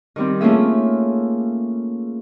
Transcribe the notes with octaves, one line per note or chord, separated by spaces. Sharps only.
D#3 G3 C4
A3 A#3 C#4 F4 G#4 E5